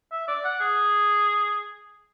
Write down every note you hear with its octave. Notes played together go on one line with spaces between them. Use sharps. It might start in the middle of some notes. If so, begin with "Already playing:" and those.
E5
D5
F#5
G#4